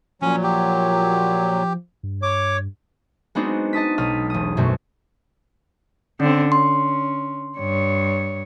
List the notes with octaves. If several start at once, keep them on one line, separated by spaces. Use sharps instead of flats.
A#2 F3 F#3 C#4
G4
G2
C#5 D6
G#3 B3 C4 D4 D#4 F#4
D#5 A5 D#6 B6
B1 D#6 F6 B6
E1 D#6
F#2 B2 A3 C4
D3 C4 C#4
C#4 C6
G2 C#5